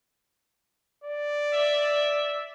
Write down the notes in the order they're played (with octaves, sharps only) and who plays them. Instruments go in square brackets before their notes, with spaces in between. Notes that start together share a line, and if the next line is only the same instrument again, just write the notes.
[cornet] D5
[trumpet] E5